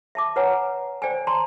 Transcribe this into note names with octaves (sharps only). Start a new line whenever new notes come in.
E5 A5 D6
B4 C#5 F#5 G#5 A#5
C5 D5 G5 G#5
D5 A5 A#5 C6